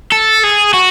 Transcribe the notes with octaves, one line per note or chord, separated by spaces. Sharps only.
A4
G#4
F#4